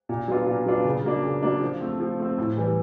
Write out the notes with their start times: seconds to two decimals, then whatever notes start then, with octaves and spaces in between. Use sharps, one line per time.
0.09 A#2
0.28 F#3 B3 D4 F4
0.47 A#2
0.66 F#3 B3 D4 F4
0.85 C#3
1.05 F#3 A#3 D4
1.23 C#3
1.43 F#3 A#3 D4
1.61 F3
1.81 A3 C4
2.00 F3
2.19 A3 C4
2.38 A2
2.57 E3 G3